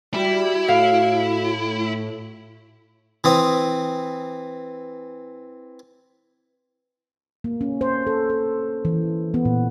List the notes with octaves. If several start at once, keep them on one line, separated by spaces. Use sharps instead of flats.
G3 E4 F#4
A2 F5
E3 C4 D#6
A#3
C#4
C5
A4
A4
E3
B3
A#2